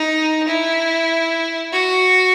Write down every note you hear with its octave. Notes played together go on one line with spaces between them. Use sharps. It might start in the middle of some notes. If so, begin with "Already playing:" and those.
Already playing: D#4
E4
F#4